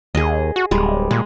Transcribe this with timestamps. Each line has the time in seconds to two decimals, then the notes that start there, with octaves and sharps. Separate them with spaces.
0.15 D#2 G#4 D#5
0.56 F#4
0.71 D1 G3 G#3
1.11 A#2 G#3